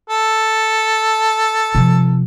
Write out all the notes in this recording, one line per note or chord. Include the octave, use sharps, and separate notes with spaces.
A4
C3 F3